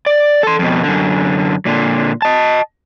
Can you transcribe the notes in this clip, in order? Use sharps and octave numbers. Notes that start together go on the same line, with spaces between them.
D5
A4 C6
F2 B2
F#2 D3
A#2 D3
D#5 A5